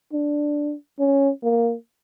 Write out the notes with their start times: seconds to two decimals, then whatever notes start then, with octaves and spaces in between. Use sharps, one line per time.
0.13 D4
0.99 C#4
1.43 A#3